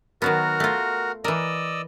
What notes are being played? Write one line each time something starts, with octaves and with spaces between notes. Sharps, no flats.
D#3 F#3 B3 F#4 A#4
A3 F4
E3 A#4 D5 D#5 E6